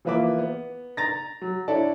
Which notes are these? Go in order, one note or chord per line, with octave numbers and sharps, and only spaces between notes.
E3 F3 A#3 B4 E5 D6
B3
A#5 A6 A#6
F#3
D4 E4 A4 C#5 D5 A5